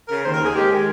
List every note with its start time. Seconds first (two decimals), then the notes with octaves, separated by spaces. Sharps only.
0.08 C#3 A#4
0.24 D#2 C5
0.34 A#4
0.39 D#2
0.45 G#4
0.54 G#3 G4
0.70 D#3 G#4